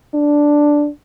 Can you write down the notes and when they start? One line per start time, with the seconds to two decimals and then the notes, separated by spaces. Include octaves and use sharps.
0.14 D4